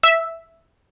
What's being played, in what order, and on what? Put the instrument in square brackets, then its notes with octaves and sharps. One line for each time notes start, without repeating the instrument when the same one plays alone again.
[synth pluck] E5